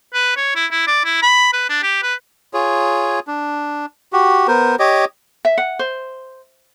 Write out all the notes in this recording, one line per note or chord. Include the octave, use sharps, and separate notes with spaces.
B4
C#5
E4
E4
D5
E4
B5
B4
D4
G4
B4
F4 G#4 C#5
D4
F#4 G4
B3 A#4 C5
G4 C#5 D#5 D6
E5
F#5
C5